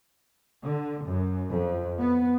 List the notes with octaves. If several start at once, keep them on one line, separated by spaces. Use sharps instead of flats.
D3
F#2
F2
B3